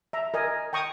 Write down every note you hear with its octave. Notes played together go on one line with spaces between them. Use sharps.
E5 A#5
A#4 D#5 G#5
G5 A#5 C#6 D#6